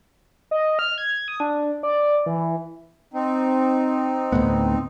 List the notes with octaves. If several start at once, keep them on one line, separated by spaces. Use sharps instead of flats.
D#5
F6
G#6
D#6
D4
D5
E3
C4 D#4
D2 A2 B3